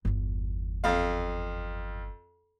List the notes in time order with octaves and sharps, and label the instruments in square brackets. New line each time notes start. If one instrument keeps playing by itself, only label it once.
[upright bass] G1 E2
[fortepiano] F2 F5